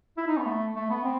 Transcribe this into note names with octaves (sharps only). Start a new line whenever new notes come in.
E4
D#4
B3
A3
A3
B3
C4